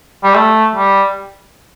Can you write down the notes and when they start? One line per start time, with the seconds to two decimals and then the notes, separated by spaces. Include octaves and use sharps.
0.24 G3
0.35 A3
0.75 G3